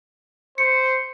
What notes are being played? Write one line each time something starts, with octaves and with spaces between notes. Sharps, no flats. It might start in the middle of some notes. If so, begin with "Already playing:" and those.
C5 C#7